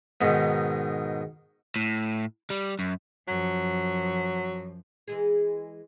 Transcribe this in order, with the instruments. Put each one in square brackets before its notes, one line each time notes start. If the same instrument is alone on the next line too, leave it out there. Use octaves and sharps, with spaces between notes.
[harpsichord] G#2 B2 D#3
[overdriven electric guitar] A2
G3
F#2
[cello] F#2 F3 [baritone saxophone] F#3
[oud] E3 G#3 G#4